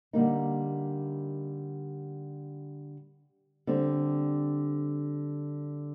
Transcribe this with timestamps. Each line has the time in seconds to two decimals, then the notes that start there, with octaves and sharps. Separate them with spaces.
0.13 D3 G3 A#3 D#4
3.67 D3 G3 C4